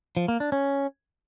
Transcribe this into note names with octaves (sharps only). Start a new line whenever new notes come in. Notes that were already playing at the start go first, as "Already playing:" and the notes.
F3
A#3
D4
C#4